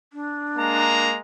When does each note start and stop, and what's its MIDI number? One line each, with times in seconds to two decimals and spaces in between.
0.13 1.08 62
0.58 1.19 56
0.58 1.19 58
0.58 1.19 82